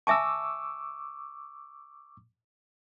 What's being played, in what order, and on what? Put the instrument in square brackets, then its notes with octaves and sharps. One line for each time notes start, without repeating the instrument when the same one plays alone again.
[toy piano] E5 G#5 A5 [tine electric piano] C#6 D6 E6